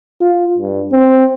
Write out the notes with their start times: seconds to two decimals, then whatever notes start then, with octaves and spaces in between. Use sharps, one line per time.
0.21 F4
0.58 G2
0.92 C4